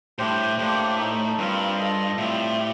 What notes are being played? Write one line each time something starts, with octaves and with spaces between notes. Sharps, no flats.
A2 G3 D4 G4 C5
A2 A#3 D4 G4 C5
A3 D#4 A4
G2 C4 F4 A#4
F4 A4 D#5
A2 G3 C4 F4
G4